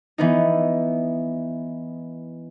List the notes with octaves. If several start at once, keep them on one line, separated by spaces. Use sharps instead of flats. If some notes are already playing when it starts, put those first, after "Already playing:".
E3 B3 D#4